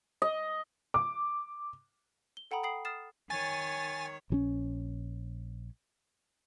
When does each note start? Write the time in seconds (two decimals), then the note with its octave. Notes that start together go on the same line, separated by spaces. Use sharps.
0.22 D#5
0.94 D6
2.37 G7
2.51 A4 F#5 G5 A#5 B5 D#6
2.63 G5 B5 D#6 C7 F#7
2.85 D#6 F6 A6 C7 E7
3.30 D#3 C#5 G#5 A6
4.30 A#1 E3 C#4